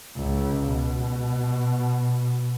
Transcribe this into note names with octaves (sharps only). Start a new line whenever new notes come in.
C#2
B2